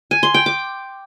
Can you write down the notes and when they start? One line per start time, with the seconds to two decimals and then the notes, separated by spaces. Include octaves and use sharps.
0.11 G#5
0.23 C6
0.34 G5
0.46 D6